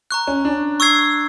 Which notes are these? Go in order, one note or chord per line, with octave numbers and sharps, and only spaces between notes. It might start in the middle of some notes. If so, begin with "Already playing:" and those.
A#5 C#6 F#6
C#4
D4
C#6 E6 G#6 C7